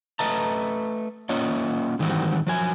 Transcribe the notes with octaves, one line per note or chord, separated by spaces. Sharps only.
A3 B4 D#5 A5 A#5
A#3 C#4 F4 C#5 D#5
G#2 D#3 E3 G3 C4 F#4
F3 F#3 G#5